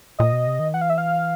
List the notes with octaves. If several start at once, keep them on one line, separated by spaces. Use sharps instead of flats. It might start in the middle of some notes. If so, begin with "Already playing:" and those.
A#2 D#5
B2
C3
D#3
E3 F#5
F5
E5
F5